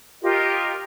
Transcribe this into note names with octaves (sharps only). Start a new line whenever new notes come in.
F4 G4 A#4 D#5